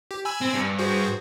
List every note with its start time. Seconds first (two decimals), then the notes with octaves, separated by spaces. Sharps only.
0.11 G4
0.25 G#5 B5 E6
0.42 C4
0.55 G2
0.78 F#4 G#4 C5